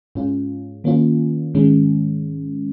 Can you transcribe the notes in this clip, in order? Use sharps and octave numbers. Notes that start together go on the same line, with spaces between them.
G#2 G#3 C#4 F4
D#3 A#3 C#4 F4
G#2 D#3 G#3 C#4